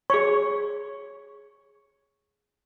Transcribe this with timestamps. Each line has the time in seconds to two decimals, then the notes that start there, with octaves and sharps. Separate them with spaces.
0.10 G#4 C#5 C#6